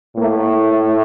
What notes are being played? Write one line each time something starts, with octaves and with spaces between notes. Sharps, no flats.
A2 A3 A#3